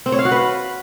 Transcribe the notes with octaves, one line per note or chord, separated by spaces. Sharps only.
C4
C#5
F5
F#4
B4